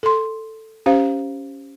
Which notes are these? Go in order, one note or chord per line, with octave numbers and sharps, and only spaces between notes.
A4 C6
C#4 G4 C5 F5